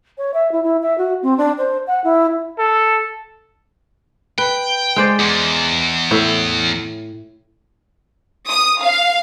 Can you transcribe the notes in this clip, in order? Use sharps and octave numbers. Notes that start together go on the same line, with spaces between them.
C#5
E5
E4
E4
E5
F#4
C4
D4
C5
F#5
E4
A4
B4 G5
G#3 C5 D5
E2 G#4
A2 C#5 E5
D#6
F5